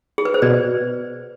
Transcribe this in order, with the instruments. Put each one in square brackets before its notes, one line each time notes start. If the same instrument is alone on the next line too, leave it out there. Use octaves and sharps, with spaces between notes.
[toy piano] G#4
B4
C5
[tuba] B2 [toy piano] B4 D5